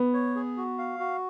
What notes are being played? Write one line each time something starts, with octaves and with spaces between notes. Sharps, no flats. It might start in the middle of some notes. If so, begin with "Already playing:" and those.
Already playing: B3
C#5
G#4
F#4
F5
F#4